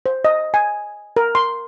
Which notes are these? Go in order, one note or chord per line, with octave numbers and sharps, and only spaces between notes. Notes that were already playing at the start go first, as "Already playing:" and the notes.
C5
D#5
G#5
A#4
C6